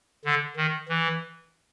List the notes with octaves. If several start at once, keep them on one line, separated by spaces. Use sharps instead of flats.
D3
D#3
E3